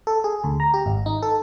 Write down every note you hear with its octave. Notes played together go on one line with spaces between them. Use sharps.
A4
G#4
D2
A#5
G4
G#1
D#4
A4